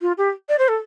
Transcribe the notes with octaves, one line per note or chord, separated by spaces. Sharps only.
F4
G4
D5
C5
A4